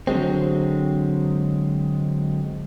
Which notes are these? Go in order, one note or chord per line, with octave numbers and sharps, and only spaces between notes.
D3 F#3 G#3 C4